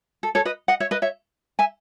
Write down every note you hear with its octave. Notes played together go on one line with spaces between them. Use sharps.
A4
A4 C#5
B4 D#5
D#5 F#5
C#5 E5
B4 D#5
C#5 E5
E5 G#5